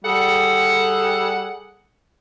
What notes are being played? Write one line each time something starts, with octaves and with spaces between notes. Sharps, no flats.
G3 G#4 A4 F#5